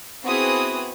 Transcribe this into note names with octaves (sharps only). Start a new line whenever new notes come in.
B3 C4 E4 F#4 G#4 D#6